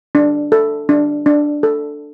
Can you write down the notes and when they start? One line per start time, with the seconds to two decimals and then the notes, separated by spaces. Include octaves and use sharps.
0.15 D4
0.52 A4
0.89 D4
1.26 D4
1.63 A4